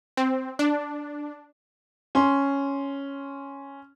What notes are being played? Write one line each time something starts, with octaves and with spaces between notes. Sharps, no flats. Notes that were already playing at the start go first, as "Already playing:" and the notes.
C4
D4
C#4 C6